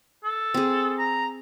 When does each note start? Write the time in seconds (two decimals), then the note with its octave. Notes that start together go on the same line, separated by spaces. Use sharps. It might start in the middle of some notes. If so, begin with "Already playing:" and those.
0.24 A4
0.54 C4 G#4
0.99 A#5